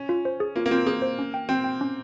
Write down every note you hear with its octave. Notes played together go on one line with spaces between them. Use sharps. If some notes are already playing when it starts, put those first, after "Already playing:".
Already playing: C#4
F4
C5
G#4
A#3 F4
A#3
C4 F4
A#3 G#4
C5
C#4
G5
C4 G5
G5
C#4